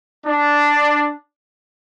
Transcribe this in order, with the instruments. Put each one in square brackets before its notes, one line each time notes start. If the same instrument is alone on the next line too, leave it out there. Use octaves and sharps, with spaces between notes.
[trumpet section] D4